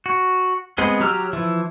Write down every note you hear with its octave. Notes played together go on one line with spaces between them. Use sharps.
F#4
G#3 B3 C4 G#4
F#3 G4 A#5 E6 F6
E3 F3 E4